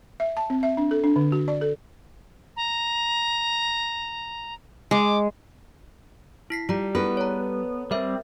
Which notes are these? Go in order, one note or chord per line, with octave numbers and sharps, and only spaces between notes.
E5
A5
C4
E5
D4
A4
D4
D3
F#4
D5
A4
A#5
G#3 D6
E4 B6 C7
G3 F4 A#5
B3 E4 G#4 A4 B4
C#5 A#5
G3 C4 A#4 C5 E5